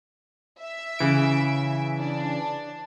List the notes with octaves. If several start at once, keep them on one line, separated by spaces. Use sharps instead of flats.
E5
C#3 E3 D7
D4